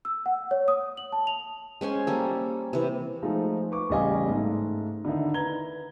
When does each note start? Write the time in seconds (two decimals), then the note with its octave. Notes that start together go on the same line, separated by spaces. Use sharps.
0.05 E6
0.26 F#5
0.51 C#5
0.68 D#6
0.97 F#7
1.12 A5
1.27 F7
1.81 G#3 C#4 C5 G#5
2.07 G3 A#3 A4
2.73 C3 E3
3.22 F3 G#3 A3 D#4
3.71 B4 C#6 D6
3.89 A1 C#3 G3 D#5 F5 G#5
4.28 G#2 A3
5.05 D3 D#3 D#4 E4
5.34 B4 A#5 G#6 G7